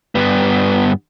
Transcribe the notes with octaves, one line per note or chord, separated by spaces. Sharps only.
G2 B3